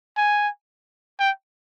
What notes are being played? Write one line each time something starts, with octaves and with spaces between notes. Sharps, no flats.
G#5
G5